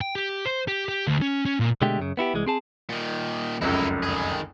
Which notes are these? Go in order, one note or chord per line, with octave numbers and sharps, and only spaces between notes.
G5
G4
C5
G4
G4
D2
C#4
C#4
A#2
B2 D3 G#3 A3 G4 G5
F#2 C#3
B3 E4 F#4 G4
C2 E3 G#3
C4 G#4 A5
A#2 D#3
F1 C#2 F#2 D#4 E4
D#3 G#4